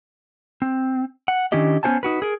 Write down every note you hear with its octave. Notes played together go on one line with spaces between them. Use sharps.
C4
F#5
D#3 C#4 D4 E4 G4 D#5
B3 C#4 F#4 C5 G#5 A5
D#4 F#4 B4
G#4 A#4